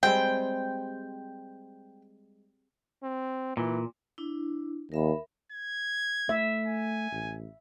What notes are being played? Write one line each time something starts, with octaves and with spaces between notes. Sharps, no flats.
G3 G#3 C4 G5
C4
A#2 E3
D4 E4
D#2 A#4 E5 B5
G#6
A3 E5
G#5
A1